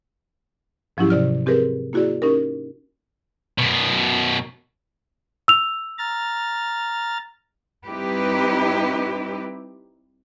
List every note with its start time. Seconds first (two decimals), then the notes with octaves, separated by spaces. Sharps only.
0.97 G#2 F3 F#3 C#4 E4 G4
1.10 C3 D5 F6
1.46 C4 G4 G#4 A#4 B4
1.93 A#3 E4 F#4 G#4 D5
2.22 C#4 D#4 G4 A#4
3.58 F#2 B2
5.48 E6 F7
5.99 A#5 F6 A6
7.86 G3 C4 D#4 E4 G4 B4